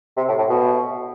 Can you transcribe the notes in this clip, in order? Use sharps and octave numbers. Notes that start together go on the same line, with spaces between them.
C3
A2
A2
B2